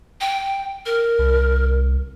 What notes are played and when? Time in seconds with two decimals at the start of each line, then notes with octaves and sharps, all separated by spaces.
0.21 G5
0.86 A#4
1.19 C2